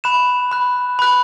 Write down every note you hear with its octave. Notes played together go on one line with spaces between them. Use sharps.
B5 F#6 E7
B5 F#6
B5 F#6